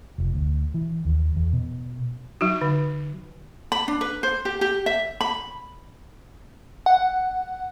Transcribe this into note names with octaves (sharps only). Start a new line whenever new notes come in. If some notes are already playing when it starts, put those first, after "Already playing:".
F1
D2
E3
D#2
E2
B2
F#3 D#4 F#4
D3
B5
D4
B4
C5
G4
G4
E5
B5
F#5